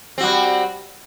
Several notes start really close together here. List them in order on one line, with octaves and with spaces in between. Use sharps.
C4 F#4 G3